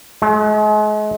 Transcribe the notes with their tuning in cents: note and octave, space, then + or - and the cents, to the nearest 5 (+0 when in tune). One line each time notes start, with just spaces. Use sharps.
G#3 +35